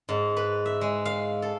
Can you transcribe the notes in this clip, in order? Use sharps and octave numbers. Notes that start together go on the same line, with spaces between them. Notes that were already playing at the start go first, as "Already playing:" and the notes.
G#2
B4
E5
G#3
F5
A4